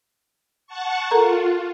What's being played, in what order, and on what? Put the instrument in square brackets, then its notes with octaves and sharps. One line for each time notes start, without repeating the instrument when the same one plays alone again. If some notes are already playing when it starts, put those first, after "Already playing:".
[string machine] F#5 A5 C#6
[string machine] F4 [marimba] A4 A#4 A#5